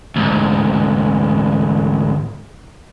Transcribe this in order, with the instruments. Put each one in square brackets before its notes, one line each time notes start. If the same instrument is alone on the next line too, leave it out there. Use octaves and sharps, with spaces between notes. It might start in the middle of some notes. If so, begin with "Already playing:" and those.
[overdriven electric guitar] D2 G#2